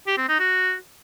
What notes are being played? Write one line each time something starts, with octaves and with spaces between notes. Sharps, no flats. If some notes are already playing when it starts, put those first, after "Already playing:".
G4
C4
D#4
F#4